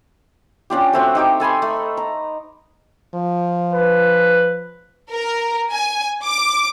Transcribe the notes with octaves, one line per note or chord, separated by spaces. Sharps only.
C#4 D4 F4 G4
A3 C4 F#4
D#4 G4 D6
A4 G#5 B5 C6
A3
A#5
F3
B4
A#4
G#5
D6